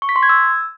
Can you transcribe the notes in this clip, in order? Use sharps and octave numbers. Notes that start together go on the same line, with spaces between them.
C#6
B6
C6
G#6
E6